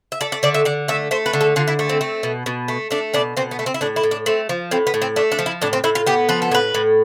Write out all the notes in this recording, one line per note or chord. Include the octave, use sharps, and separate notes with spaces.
E5
A3 D5
D5
D3 D5
E5
D3 D5
A3 E5
A3 C5
B4
D3
A4
D3 F4
E4
A3
C4
A3
B2
B2
A3
A3 D4
B2 D4
B2 C4
B3
A3
C4
E4
A2 D4
E4
A2
D4
A3 C4
F3
A2 C4
B3
A2
C4
A3 D4
D4
F3
E4
A2 D4
C4
A2 E4
F4
B3 G4
F3 B4
A4
A2 B4
A2